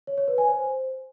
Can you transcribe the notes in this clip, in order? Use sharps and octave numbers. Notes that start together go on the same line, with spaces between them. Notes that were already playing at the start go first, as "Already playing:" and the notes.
C#5
C#5
B4
G#5
C5